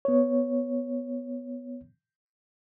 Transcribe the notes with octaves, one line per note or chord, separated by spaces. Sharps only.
B3 C#5